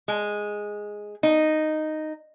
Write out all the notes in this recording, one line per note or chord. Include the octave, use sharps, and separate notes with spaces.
G#3
D#4